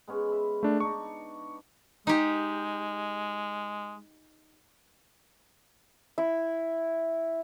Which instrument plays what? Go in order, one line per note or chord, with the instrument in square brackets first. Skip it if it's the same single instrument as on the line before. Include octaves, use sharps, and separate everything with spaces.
[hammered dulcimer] G#3 B3 C#4
E5 B5
[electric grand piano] A3 D4
[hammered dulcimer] D4 D#4 [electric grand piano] C#6
[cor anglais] G#3 [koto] D#4 G4
[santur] E4